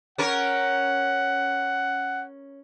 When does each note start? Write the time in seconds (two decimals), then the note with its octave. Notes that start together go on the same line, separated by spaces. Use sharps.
0.18 C#4 A#4 C#5 F#5